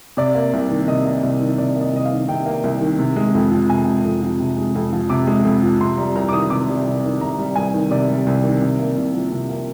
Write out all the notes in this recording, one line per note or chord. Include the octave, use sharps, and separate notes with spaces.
C3 D5
A#3
C2
D#3
C3 D#5
A#3
C2
D#3
C3 D5
A#3
D#5
C2 D#5
F5
D#3
C3 G5
A#3
C2
D#3
C3
G#3
F2
F3
C3 G#5
G#3
F2
F3
C3
G#3
F2
F3
C3 D6
G#3
F2
F3
C3 C6
G3 A#5
C2 A#5
D6
D#3 D#6
C3 D6
G3
C2
D#3
C3 A#5
G3
C2 G#5
D#3
C3 D5
G3
C2
D#3
C3
A#3
C2
F3
C3
A#3